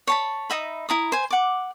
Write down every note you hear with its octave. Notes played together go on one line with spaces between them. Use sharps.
C#5 A5 B5
D#4 D#5 E5 B5
E4 A#5 D#6
C5 G#5
F#5 D6